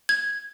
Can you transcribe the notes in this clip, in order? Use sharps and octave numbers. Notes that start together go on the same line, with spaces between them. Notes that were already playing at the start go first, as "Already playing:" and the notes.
G#6